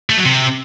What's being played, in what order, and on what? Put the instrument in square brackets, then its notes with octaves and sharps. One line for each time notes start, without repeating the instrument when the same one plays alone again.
[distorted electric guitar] A3
F#3
C3